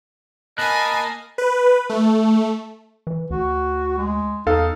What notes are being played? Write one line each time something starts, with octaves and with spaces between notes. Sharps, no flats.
A#3 D#5 G#5 A5 B5 F#6
B4
A3
E3
D2 F#4
G#3
E2 D#4 A4 F5